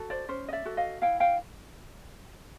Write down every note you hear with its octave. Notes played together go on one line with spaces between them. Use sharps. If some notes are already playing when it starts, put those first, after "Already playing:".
Already playing: F#4 A4
C5 D5
C#4 C5
D#5
D5 E5
F#4 A4
D#5 F5
E4 F5 G5
F5 G5